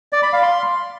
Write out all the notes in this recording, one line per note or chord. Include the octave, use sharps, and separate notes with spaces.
D5
B5
F5
C6